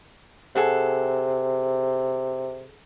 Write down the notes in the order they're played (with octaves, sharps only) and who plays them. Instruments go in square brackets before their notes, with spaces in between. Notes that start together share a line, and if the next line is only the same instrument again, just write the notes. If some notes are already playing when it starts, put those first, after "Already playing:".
[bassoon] C3 [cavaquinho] G#4 A4 F#5